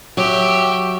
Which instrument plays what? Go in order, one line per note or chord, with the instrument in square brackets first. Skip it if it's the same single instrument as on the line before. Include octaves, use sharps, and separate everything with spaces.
[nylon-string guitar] F#3 [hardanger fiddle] G4 E5